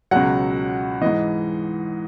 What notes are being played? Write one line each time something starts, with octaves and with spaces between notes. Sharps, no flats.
C#2 B2 F#3 F#5
G#2 E3 D#5